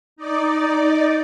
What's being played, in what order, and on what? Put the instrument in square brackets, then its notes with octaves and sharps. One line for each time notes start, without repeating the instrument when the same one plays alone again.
[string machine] D#4 D5